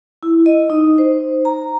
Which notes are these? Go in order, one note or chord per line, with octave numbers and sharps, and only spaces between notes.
E4
D#5
D#4
C5
A#5